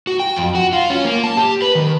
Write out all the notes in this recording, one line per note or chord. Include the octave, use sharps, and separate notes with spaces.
F#4
G5
F2
F#4
F4
C#4
A#3
A5
G4
B4
D#3